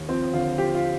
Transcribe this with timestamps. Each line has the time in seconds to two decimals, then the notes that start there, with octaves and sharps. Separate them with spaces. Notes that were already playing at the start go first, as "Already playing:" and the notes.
Already playing: D#2
0.09 F3 C4
0.33 D3 F4
0.58 F3 G4
0.74 F4